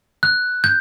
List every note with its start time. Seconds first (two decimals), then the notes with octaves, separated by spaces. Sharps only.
0.23 F#6
0.64 G6